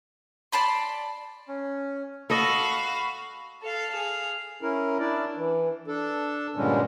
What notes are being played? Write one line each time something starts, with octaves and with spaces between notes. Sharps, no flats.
D5 A5 B5 C6
C#4
F#4 A4 D#5 F5 B5
A4 F5
G#4 F5
C#4 E4 A#4
D4 E4 D5
E3
D4 A4
G2 A#2 D3 G3 G#3 C#4